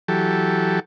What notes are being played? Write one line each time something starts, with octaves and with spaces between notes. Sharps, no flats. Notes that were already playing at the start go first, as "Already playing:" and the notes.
E3 F#3 G4 A4